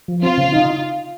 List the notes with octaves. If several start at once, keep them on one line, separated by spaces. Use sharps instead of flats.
F3
C4 F4
C#3
D#4